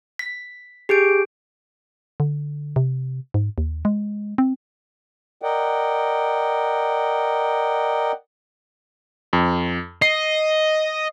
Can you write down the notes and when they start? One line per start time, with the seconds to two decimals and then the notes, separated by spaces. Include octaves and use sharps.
0.19 B6
0.89 G4 G#4 G6 D7
2.20 D3
2.76 C3
3.34 G#2
3.58 D#2
3.85 G#3
4.38 C4
5.42 A#4 D5 D#5 F#5 G5
9.33 F2
10.02 D#5 C7